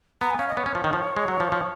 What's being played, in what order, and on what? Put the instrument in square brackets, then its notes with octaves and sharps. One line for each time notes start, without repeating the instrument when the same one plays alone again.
[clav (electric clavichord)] B3 [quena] A#5
[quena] G#5
[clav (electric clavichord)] C#4 [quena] F5
[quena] D#5
[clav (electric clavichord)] B3 [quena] C#5
[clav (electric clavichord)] C#4
F3
D#3
F3
G#3
F#3
F3
F3